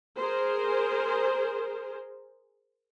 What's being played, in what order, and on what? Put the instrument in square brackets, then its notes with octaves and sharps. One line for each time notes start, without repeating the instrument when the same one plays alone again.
[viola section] G#4 A#4 C5